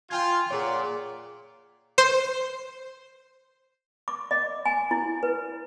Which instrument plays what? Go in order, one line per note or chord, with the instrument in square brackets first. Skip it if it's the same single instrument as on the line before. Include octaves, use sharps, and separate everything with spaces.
[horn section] F4 [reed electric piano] G5 G#5 G#6
[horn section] A#2 D5 F#5 [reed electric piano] G#4 C#5
[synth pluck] C5
[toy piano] D6
D#5
G#5
E4
B4